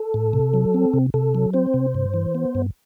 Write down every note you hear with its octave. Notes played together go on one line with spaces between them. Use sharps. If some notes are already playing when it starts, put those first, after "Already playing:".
Already playing: A4
A2
C3
F#3
C4
C3
C3 A4
F#3
C4 C5
C3
G2
E3
B3
G2